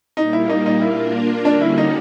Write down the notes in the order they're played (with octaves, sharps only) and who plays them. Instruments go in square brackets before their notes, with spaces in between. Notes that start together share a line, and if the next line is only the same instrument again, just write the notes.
[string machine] A#2 G3 A#3 [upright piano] D#4
[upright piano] E4
D#4
D#4
[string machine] A#3 D4 F4 A#4 [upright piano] E4
[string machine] D3 G3 A#3 C#4 F#4 [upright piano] D4
[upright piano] E4
D#4